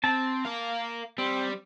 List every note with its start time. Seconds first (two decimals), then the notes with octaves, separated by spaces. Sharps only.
0.04 C4 A5
0.45 A#4 F5
1.18 G3 C4